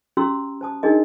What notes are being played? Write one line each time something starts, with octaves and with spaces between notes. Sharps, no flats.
C#4 F#4 G4 A#5 C6 E6
C5 A5 D#6
D4 D#4 F#4 G#4 A#4 D#5